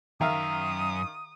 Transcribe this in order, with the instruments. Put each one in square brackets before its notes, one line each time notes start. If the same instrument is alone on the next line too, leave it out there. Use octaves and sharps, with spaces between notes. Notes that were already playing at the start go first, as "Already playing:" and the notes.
[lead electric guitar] F#2 A#5 [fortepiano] D#3 E5 F5 [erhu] D#6